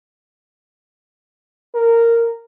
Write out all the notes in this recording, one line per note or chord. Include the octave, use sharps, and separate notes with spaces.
A#4